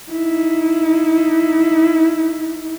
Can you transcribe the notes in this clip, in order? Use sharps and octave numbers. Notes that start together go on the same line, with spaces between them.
D#4 E4